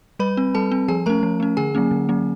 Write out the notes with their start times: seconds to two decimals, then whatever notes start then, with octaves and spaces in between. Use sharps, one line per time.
0.19 G3 B4 B5
0.37 C4
0.54 G3 A4 A5
0.72 C4
0.88 F3 G#4 G#5
1.06 A3 C#4 A#4 A#5
1.23 F3
1.40 A3 C#4
1.57 D3 G#4 G#5
1.75 F#3 A#3 C#4
1.91 D3
2.09 F#3 A#3 C#4